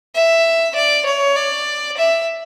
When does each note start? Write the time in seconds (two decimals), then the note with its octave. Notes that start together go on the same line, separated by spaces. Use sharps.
0.14 E5
0.75 D5
1.06 C#5
1.36 D5
1.97 E5